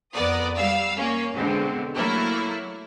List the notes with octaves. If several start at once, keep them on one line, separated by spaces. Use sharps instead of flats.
F2 B3 A#4 D5 D#6
G3 F5 E6
A#3 C#4
B2 D3 G#3 C4
F#3 A3 A#3 E4